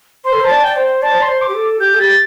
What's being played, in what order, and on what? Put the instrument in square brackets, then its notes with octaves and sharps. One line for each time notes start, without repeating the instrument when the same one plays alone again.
[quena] C5 [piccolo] C6
[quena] A4
[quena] C5 [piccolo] A5
[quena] D5
[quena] D5 [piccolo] G5
[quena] C5
[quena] D5 [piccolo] A5
[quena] C5
[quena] D5 [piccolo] C6
[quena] C5
[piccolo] D6
[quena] G4
A4
[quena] G4 [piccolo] G6
[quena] A4
[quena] G4 [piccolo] A6